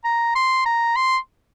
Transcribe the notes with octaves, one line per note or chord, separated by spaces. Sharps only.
A#5
C6
A#5
C6